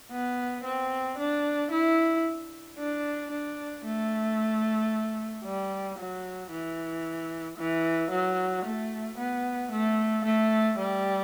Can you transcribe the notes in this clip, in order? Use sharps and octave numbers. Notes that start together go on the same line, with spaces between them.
B3
C4
D4
E4
D4
D4
A3
G3
F#3
E3
E3
F#3
A3
B3
A3
A3
G3